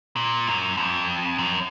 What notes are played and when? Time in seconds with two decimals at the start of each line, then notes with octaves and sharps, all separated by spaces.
0.16 A#2
0.47 F#2
0.77 F2
1.38 F#2